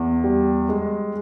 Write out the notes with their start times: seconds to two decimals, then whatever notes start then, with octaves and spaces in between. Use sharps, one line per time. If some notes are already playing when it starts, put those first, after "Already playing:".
Already playing: E2
0.24 G3
0.69 G#3